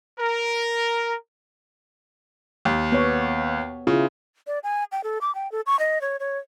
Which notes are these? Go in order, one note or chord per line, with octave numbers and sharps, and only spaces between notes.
A#4
D#2
B3 C#5
C#3 E4 F4
D5
G#5
G5
A4
D6
G5
A4
C#6
D#5
C#5
C#5